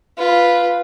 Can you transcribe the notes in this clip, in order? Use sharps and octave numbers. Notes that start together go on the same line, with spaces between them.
F4 B4